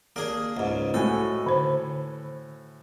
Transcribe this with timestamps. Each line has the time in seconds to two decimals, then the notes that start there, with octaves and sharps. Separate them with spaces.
0.16 A#3 D4 G#4 D5
0.57 C#2 G#2
0.94 A2 F#4 A4 G#5
1.46 D3 C5